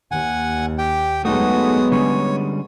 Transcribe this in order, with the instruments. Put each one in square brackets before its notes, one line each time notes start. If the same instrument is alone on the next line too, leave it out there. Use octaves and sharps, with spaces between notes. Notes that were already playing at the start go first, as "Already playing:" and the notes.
[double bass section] D#2 [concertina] F#5 G#5
[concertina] G4 G5
[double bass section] F#3 G#3 B3 [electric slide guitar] A3 D#4 A4 [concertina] F#4 D#6
[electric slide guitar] D3 G3 C#4 [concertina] C#5